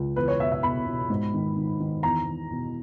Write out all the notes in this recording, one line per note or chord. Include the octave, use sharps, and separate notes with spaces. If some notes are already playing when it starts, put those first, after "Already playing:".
Already playing: C#2
E2 B4
C#5
B2 E5
E5
B2 B5
B2
G#2
D#3
D#3
D#3
E2 A#5
E2
B2